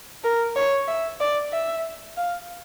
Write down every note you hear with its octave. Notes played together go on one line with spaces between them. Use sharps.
A#4
C#5
E5
D5
E5
F5